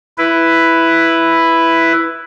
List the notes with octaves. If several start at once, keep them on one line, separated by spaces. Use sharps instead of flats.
E4 B4